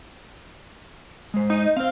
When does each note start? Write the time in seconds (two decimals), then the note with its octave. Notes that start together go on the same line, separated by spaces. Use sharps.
1.34 G#3 C5
1.50 D#4
1.76 C4 C5 F5